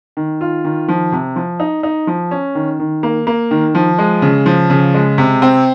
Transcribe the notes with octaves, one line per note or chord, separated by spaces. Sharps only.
D#3
F4
D#3
F3
C3
F3
D#4
D#4
F3
C#4
D#3
D#3
A#3
A#3
D#3
F3
G#3
C#3
F3
C#3
G#3
C3
C4